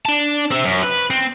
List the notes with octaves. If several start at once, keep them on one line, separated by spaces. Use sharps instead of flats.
D4 A5
C4 E5
F#2
B4
C4